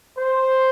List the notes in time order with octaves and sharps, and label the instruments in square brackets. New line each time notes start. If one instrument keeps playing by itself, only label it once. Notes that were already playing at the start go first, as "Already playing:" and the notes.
[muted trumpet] C5